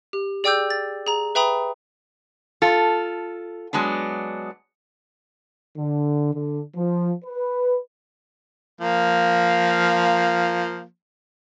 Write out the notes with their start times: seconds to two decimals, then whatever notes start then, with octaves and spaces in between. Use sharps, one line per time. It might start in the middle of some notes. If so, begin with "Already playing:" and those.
0.13 G4
0.44 G#4 D5 G5 D6 E6 G6
0.70 A6
1.07 G#4 A#5
1.35 B4 E5 G5 A#5 B5 D#6
2.62 F4 A4
3.73 F#3 G#3 B3 D4
5.78 D3
6.34 D3
6.75 F3
7.24 B4
8.81 F3 A#3